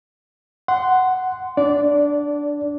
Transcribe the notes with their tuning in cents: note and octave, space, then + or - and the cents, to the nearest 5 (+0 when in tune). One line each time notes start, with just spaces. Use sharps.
F#5 +5 C6 -15
D4 +0 D5 -20